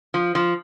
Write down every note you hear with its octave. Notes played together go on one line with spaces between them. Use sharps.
F3
F3